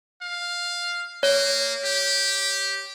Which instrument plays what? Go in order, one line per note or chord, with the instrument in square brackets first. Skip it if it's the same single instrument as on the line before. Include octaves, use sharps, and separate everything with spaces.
[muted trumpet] F5
[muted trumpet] A#3 [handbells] C#5
[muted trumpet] G4